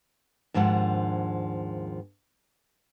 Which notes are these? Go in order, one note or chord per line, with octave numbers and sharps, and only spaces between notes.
D#2 G#2 F3 D4 F#5